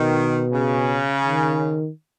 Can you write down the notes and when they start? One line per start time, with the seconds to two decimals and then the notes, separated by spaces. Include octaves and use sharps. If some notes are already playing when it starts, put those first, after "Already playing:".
Already playing: B2 D#3
0.52 C#3
1.25 D#3